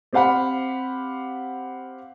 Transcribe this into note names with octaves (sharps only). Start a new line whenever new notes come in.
C4 G4 C5 F5 F#5 B5